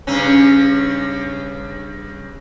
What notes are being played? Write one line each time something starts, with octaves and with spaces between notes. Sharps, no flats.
G2 C#3 C#4